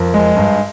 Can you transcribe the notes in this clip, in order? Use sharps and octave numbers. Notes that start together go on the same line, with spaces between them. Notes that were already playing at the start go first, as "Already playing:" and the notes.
Already playing: F2 A#4
G#3
G2